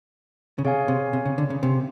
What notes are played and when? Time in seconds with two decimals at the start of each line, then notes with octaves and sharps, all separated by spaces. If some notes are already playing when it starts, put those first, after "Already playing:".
0.58 C#3
0.65 C3 G#4 C#5 F5 G#5
0.88 C3
1.13 C3
1.25 C#3
1.38 D3
1.50 C#3
1.63 C3